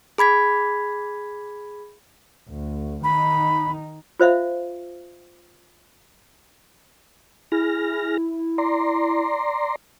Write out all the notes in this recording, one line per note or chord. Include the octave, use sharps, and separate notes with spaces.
G#4 B5 G#6 B6
D2
D#3 D#4 B5
F4 C5 E5 F5
E4 G#4 F6 A#6
D5 A#5 C6